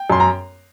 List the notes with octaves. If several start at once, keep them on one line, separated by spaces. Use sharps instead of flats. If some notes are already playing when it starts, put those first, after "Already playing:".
Already playing: G5
F#2 C6
A#5